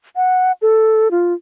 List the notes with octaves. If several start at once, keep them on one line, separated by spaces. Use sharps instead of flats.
F#5
A4
F4